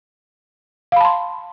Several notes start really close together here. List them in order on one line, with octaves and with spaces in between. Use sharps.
F5 B5 A5 C6